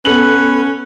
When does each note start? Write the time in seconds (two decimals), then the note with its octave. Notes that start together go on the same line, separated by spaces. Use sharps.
0.05 B3 C#4 A4 B4 F#7